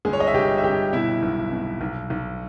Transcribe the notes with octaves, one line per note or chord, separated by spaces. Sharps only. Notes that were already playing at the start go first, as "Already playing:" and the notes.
G1 G#3 G#4
C#5
D#5
E5
G1 G4 G5
E5
G1 G4 G5
B2 E4 E5
B1
B2
B1
B1